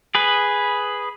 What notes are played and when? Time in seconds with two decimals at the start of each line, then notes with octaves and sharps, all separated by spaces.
0.15 G#4 B4